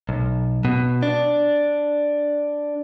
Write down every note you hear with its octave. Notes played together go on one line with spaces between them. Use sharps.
B1
B2
D4